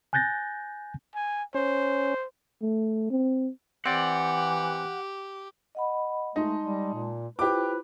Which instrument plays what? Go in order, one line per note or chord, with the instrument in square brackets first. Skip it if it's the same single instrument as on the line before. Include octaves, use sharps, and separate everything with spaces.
[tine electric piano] G#5 F#6 G6 A6 A#6
[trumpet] G#5
[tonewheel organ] C#4 [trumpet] C5
[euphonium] A3
C4
[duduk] E3 [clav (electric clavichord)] C4 D5 [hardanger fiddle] G4 [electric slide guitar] F#5
[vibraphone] D#5 F#5 B5
[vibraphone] G#3 A5 C6 [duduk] A3 [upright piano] D#4 D#5
[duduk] G3
A#2
[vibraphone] E4 F4 C5 [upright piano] G4 D6 [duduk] B4